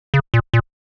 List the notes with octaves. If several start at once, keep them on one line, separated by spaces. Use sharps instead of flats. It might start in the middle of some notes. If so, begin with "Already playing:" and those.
C#3
A#2
A#2